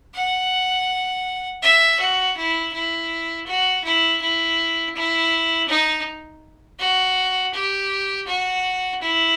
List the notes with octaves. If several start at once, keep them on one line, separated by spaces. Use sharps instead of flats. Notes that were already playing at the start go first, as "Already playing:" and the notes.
F#5
E5
F#4
E4
E4
F#4
E4
E4
E4
D#4
F#4
G4
F#4
E4